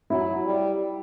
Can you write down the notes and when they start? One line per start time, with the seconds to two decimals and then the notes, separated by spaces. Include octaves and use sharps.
0.10 F#3 E4
0.46 G3